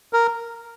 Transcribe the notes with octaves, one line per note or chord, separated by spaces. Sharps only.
A#4